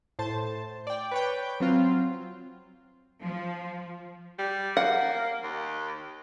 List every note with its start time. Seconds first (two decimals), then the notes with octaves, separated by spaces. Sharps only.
0.19 A2 C5 A5
0.87 D5 G5
1.11 B4 C#5 G5
1.60 F#3 C4 F4
3.22 F3
4.39 G3
4.77 A#3 F#5
5.43 D#2